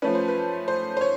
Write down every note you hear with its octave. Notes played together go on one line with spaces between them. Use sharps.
F3 A3 C#4 B4
C5
B4
C5
C5
C#5